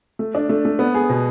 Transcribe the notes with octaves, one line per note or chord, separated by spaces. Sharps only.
A3
D4
A3
A3
B3
G#4
B2